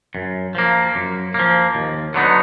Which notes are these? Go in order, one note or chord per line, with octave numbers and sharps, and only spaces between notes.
F#2
F3 A#3
F#2
F3 A#3
D#2
D3 F#3 B3 D#4